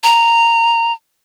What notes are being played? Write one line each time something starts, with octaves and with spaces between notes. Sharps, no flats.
A#5